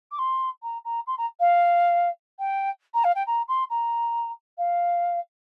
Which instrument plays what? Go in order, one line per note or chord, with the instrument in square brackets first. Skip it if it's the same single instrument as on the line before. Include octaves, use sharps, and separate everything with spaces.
[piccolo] D6
C6
A#5
A#5
C6
A#5
F5
G5
A#5
F5
G5
A#5
C6
A#5
F5